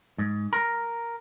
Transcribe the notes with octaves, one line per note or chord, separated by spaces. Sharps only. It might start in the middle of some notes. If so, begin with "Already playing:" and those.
G#2
A#4